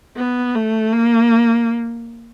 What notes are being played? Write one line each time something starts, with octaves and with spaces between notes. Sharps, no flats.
B3
A3
A#3